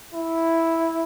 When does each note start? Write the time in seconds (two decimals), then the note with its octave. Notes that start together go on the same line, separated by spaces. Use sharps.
0.14 E4